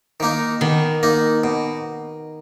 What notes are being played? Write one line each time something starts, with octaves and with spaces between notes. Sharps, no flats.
D#3 A#3 D#4
B2 D#3
A#3 D#4
B2